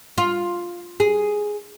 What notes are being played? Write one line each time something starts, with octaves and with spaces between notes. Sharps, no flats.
F4
G#4